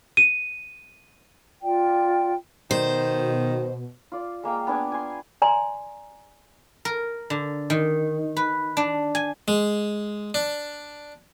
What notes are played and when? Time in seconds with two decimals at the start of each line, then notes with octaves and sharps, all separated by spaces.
0.17 D#7
1.61 F4 D5 G5
2.71 B2 D#3 C5
4.12 F4 D5
4.43 G#3 A#3 F5 G5
4.67 B3 D4 G#5 D6
4.92 G#5 C6
5.42 D5 G#5 A#5 C6
6.85 A#4
7.30 D3
7.70 D#3
8.37 B4
8.77 D4
9.15 G#5
9.48 G#3
10.34 D4